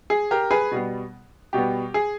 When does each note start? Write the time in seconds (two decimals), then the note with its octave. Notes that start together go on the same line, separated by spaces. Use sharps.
0.10 G#4
0.31 G4 A#4
0.51 G#4 B4
0.72 B2 G3 B3
1.53 B2 G3 B3 G4
1.94 G#4